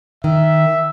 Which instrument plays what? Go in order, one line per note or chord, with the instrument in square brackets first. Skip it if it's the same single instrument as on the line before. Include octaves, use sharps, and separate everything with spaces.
[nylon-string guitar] D#3 [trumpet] E5